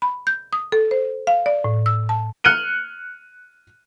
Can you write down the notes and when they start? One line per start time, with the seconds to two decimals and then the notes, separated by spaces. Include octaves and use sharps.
0.02 B5
0.27 G6
0.53 D#6
0.72 A4
0.91 C5
1.27 F5
1.46 D5
1.64 A2
1.86 E6
2.09 A5
2.44 F6 F#6 C#7 D#7 G7